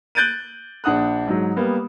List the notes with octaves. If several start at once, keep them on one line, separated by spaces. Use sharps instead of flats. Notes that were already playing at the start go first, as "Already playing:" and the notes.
F#6 G6 A6 D7 D#7
A#1 D4 F#5 D#6 F#6
G#2 F#3
G3 A#3 B3